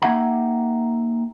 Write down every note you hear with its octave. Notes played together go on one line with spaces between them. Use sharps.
A#3 D#4 G4 E5 F#5 A#5